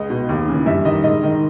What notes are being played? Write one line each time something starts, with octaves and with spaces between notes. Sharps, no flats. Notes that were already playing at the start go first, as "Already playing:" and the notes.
Already playing: C#2 D#5
B2
D#2
C#3 E3
G2 E5
D#3 D#5
G#2 D#5
D#3